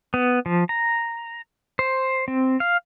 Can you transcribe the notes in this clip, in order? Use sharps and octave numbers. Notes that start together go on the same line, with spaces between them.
B3
F3
A#5
C5
C4
F5